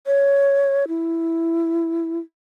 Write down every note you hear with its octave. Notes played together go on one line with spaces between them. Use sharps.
C#5
E4